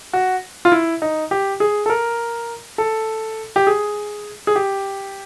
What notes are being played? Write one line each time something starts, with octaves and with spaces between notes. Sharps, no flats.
F#4
F4
E4
D#4
G4
G#4
A4
A#4
A4
G4
G#4
G#4
G4